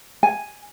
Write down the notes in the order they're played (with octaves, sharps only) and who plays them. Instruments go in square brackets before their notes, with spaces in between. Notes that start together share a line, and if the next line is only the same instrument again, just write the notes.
[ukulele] G#5